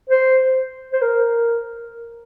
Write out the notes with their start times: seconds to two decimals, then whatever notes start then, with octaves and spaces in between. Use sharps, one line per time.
0.09 C5
0.93 C5
1.02 A#4